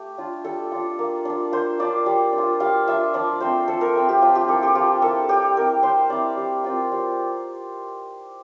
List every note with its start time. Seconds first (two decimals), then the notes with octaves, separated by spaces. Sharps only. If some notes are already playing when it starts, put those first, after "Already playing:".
Already playing: A3 G4
0.18 D4 F4
0.44 G3 A4
0.72 D4 F4
0.99 A#3
1.25 D4 F4
1.52 A#3 C5
1.79 D4 F4 D5
2.06 G3
2.33 D4
2.38 F4
2.60 G3 F5
2.87 D4 F4 E5
3.14 F3 D5
3.40 A3 C4 C5
3.68 F3 A4
3.81 A#4
3.95 A3 C4
4.09 G4
4.21 F3 F4
4.35 G4
4.48 A#3 E4 A4
4.63 G4
4.75 F3 F4
5.02 A#3 E4 A4
5.29 G3 G4
5.56 C4 E4 A#4
5.83 G3 C5
6.10 C4 E4 D5
6.37 G3
6.64 C4 F4
6.92 G3